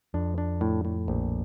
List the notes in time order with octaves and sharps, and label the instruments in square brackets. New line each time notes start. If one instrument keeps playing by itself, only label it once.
[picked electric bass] F2 [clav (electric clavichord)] D4
[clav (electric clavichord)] D4
A2
A2
A#1